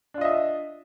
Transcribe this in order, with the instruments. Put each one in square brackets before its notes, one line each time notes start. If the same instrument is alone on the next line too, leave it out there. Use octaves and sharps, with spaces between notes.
[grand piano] D4
F4
D#5
E5